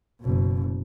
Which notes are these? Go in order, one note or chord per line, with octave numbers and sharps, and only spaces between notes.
F#1 B2